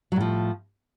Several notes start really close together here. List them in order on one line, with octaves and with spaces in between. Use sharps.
F#3 A2 F3